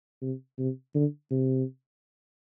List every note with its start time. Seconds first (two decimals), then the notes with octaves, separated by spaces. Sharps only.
0.22 C3
0.58 C3
0.94 D3
1.31 C3